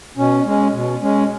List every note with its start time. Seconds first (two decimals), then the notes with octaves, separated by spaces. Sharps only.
0.17 B2 C#4
0.45 G#3 C#4
0.73 B2
1.02 G#3 C#4